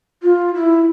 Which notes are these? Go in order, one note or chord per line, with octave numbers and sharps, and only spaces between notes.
F4
E4